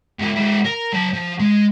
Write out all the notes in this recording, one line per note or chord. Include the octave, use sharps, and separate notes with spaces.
G#2 F4
G#3 E4
A#4
F#3 A5
F3
G#3